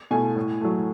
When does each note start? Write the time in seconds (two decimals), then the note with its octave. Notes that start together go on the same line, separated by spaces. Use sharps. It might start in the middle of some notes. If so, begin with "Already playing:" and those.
0.11 B2 A3 G#5
0.36 A2
0.61 F#3 A3